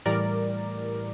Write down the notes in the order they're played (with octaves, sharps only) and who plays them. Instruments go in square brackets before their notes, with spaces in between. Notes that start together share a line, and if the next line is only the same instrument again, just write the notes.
[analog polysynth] A2 E3 G3 A#4 D5